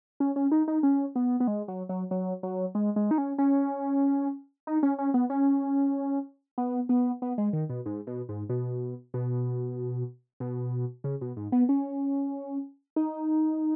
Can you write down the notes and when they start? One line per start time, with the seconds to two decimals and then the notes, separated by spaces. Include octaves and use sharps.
0.20 C#4
0.36 C#4
0.52 D#4
0.68 D#4
0.83 C#4
1.16 B3
1.40 B3
1.48 G#3
1.68 F#3
1.89 F#3
2.11 F#3
2.43 F#3
2.75 G#3
2.96 G#3
3.11 D#4
3.18 C#4
3.38 C#4
4.67 D#4
4.83 C#4
4.99 C#4
5.14 B3
5.30 C#4
6.58 B3
6.89 B3
7.22 B3
7.38 G#3
7.53 D#3
7.69 B2
7.86 G#2
8.07 B2
8.29 G#2
8.49 B2
9.14 B2
10.40 B2
11.04 C#3
11.21 B2
11.37 G#2
11.52 B3
11.69 C#4
12.96 D#4